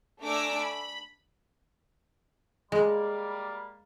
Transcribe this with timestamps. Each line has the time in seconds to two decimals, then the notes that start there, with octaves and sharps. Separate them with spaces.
0.21 A3 D4 G#5 A#5 D6 E6
0.60 B5
2.72 G3 G#3 A#3 B5